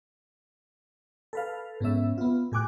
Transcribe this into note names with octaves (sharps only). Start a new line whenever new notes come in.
A4 B4 F5
G#2 B3 C#4 E5
B3 F4
A2 G4 G#5 D6 F#6